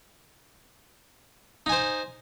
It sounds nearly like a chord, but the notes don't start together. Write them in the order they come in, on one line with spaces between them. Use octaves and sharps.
D#4 G#5 C5